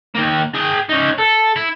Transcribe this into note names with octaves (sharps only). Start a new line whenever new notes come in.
D#3 A#3
G#4 G5
C#4 D#4
A4
E4